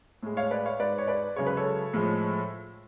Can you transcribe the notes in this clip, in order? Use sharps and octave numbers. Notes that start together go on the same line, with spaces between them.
A2 G#3
C#5 F5
B4 D5
C#5 F5
G#2 G#3 B4 D5
C#5
B4 D5
F#2 C#3 G#3 C#5
B4
A4 C#5
A2 F3 G#3